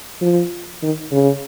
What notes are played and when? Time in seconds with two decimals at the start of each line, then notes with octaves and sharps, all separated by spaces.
0.22 F3
0.83 D#3
1.12 C#3